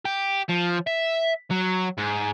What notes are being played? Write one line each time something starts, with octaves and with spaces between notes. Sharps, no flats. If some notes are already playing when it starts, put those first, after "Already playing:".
G4
F3
E5
F#3
G#2